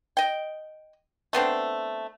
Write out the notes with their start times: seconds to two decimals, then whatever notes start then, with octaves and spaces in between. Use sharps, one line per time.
0.17 D#5 G5
1.33 A3 B3 C4 D4